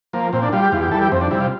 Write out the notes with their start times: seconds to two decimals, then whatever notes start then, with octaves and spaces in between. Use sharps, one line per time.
0.13 F3 A#3
0.33 A#2 C4
0.43 D4
0.52 G3 F4
0.62 G4
0.72 E2 F4
0.82 G4
0.91 E3 G3 A4
1.02 G4
1.12 F2 C4
1.21 D4
1.31 C3 G3 E4
1.40 F4